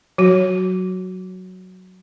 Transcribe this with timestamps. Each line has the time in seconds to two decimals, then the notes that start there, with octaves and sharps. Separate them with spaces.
0.18 F#3 F#4